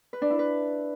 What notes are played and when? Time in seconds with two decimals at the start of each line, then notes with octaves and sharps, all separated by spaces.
0.13 B4
0.22 D4
0.30 E4
0.39 B4